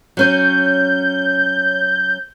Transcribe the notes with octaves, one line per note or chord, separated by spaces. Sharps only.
F#3 C#4 C#5 G6